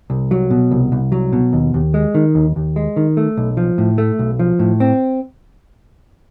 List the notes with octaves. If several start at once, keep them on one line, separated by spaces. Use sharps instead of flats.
C2
F#3
B2
C2
C2
F#3
B2
D#2
D#2
G#3
D#3
D#2
D#2
G#3
D#3
A3
B1
F3
A2
A3
B1
F3
A2
C4